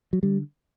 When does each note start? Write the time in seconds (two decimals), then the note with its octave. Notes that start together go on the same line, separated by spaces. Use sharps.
0.13 F#3
0.23 D3 G3